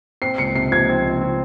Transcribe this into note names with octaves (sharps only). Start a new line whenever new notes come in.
C4 C7
C#2 C#7
C3 C7
F3 G#6
C4
C#2
C4